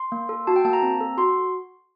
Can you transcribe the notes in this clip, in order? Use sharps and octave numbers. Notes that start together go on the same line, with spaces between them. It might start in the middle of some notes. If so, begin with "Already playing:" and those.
Already playing: C6
A#3
A4
F#4 A5
G5
A#3 A5
A#5
C4
A4
F#4 C6